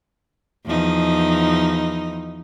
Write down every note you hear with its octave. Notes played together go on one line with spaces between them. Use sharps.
E2 F3 D#4